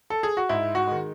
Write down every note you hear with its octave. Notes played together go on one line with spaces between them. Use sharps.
A4
G#4
F#4
G#2 E4
F#4
D#3 G#3